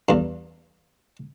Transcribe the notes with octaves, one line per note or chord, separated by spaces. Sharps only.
E2 G2